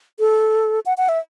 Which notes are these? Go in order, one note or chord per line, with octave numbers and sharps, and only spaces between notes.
A4
F#5
F#5
E5